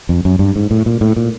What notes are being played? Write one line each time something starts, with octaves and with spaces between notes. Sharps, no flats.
F2
F#2
G2
G#2
A2
A#2
A2
A#2